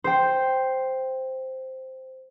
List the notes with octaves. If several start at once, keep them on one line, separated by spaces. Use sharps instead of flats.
C5 G5